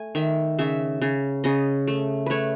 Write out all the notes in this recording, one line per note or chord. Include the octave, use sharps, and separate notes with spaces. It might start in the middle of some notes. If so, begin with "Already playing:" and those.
Already playing: A3 G#5
D#3 E5
C#3 E5
C#3
C#3 D#5
A3
A3 B4 C#5